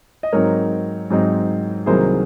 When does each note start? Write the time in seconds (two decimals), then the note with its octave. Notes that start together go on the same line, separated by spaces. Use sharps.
0.23 D#5
0.32 G#2 F#3 C4 D#4 A#4 C#5
1.10 G#2 F#3 C4 D#4
1.86 C2 C3 D#3 F#3 A#3 G#4 C5